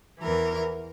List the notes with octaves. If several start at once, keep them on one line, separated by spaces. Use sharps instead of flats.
E2 E3 A#4